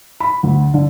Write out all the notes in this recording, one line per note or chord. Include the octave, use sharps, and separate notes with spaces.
B5
D2
D3